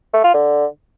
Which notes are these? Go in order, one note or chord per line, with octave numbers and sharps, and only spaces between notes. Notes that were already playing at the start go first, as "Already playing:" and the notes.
A3
F4
D3